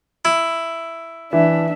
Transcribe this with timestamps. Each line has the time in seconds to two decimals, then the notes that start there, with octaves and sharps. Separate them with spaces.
0.25 E4
1.33 E3 D4 E5